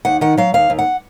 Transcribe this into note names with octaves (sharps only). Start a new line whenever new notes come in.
D#2 F#5
D#3 F#5
F#3 F5
D#2 F5
D#2
F#5